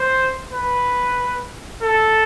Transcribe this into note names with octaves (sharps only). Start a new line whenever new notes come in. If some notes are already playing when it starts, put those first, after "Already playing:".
Already playing: C5
B4
A4